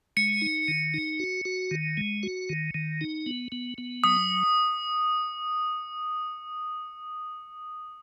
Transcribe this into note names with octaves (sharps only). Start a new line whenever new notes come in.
G#3 C#7
D#4
D#3
D#4
F#4
F#4
D#3
G#3
F#4
D#3
D#3
D#4
B3
B3
B3
F#3 D#6